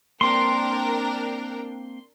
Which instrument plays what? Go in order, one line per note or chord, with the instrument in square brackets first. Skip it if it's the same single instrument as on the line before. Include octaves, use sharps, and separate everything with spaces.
[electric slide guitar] A#3 C4 [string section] D4 A#4 G5 [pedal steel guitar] C6